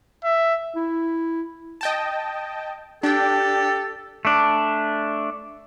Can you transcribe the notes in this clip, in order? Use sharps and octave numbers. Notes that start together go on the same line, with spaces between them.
E5
E4
D#5 G5 A5
D4 G4 A4 G5
A3 D4